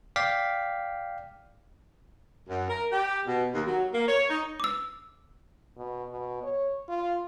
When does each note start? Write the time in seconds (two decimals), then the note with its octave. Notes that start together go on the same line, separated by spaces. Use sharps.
0.16 D5 F5 G5 D6 B6
2.48 F#2
2.69 A#4
2.92 G4
3.26 B2
3.53 D#2
3.66 F#3
3.93 A#3
4.07 C#5
4.29 D#4
4.60 D6 E6
5.77 B2
6.10 B2
6.43 C#5
6.88 F4